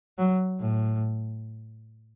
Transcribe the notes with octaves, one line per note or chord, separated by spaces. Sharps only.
F#3
A2